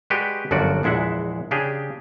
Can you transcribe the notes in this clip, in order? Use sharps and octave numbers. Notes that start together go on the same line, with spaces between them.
G#3 F#4 G4 B4 D5
G1 F#2 F3 F#4 D5
A#1 E2 G#3 E5 F#5
C#3 D4 G4 G#4